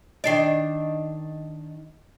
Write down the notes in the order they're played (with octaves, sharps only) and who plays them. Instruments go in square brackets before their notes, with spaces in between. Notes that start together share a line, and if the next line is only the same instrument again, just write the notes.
[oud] D#3 D4 D5 [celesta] D#5 C7